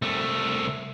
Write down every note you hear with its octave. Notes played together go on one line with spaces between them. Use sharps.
C2 A3